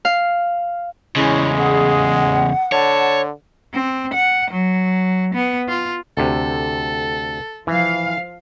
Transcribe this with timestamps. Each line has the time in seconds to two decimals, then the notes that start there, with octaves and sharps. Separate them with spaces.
0.05 F5
1.16 E2 C#3 G#3 C#4 E4
1.58 G#4 F#5
2.72 D3 C#5 A5
3.74 C4
4.14 F#5
4.51 F#3
5.34 B3
5.69 F4
6.17 D2 C3 A4
7.67 E3 F3 F5